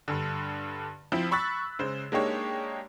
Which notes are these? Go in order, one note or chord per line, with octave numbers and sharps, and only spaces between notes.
G2 D3
F3 C4 E4
B5 C#6 E6 F#6 A6 B6
C#3 G#3 C5
G#3 A#3 D4 D#4 G4 C#5